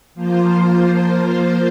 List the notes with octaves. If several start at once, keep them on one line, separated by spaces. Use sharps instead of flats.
F3 A#3 F4 C5